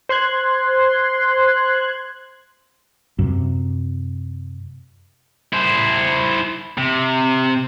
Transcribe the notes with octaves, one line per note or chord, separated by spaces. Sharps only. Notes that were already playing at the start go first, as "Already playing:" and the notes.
C5 C6 F#6 G#6
F#2 C3
E4 C5
C3